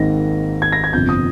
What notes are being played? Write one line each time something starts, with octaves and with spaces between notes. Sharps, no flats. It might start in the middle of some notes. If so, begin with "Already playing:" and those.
Already playing: G#1 G#2 D#3 A#3 D#4 A#6
G#6
A#6
G#6
G1 F2 C3 F3 G6
D#6